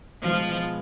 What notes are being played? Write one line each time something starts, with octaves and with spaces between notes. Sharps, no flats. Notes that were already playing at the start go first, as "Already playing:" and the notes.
B2 F3 G#3 B3